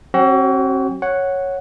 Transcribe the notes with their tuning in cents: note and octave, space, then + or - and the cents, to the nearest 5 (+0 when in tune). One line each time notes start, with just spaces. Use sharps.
F#3 +0 C4 +40 F#4 +35
C#5 -5 F#5 +0